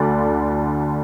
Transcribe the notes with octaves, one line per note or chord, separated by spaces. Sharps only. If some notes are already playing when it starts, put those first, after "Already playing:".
Already playing: D2 D3 D5